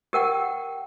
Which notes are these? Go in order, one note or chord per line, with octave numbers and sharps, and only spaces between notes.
G4 A#4 F#5 G5